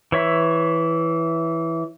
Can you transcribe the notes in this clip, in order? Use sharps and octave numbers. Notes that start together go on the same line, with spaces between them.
E3 C#5 E5